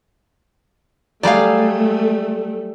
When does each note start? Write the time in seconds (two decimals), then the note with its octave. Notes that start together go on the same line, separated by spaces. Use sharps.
1.23 F#3 G3 A3 G#4 D5 F5